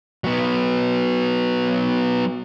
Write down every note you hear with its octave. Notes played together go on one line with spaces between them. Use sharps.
F#3 B3